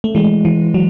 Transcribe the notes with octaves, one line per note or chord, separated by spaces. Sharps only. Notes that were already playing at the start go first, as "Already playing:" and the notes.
A3
E3 G#3
E3
F#3